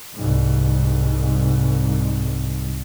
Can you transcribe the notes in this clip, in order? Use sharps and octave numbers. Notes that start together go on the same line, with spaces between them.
C2 G#2